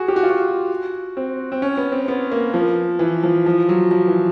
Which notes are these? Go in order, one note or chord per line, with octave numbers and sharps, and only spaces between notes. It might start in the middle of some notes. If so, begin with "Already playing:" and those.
Already playing: F#4 G#4
G4
F#4
F4
F#4
C4
C4
C#4
B3
C4
B3
A#3
F3
E3
F3
F3
F#3
F3
E3